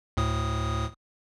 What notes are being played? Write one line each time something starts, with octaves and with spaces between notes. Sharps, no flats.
D2 A2 D#6